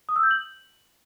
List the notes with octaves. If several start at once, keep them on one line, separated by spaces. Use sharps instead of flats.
D#6
E6
G6
F#7